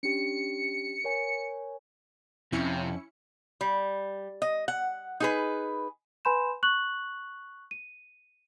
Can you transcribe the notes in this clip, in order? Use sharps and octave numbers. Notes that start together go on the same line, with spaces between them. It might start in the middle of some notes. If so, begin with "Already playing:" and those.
C#4 D4 G4 C#7
A#4 C#5 G#5
F2 C3 C#4 E4 C#7
G3
D#5
F#5
D#4 G#4 B4
B4 G#5 B5 C6 G6 E7
C#6 F#6 F#7
D#7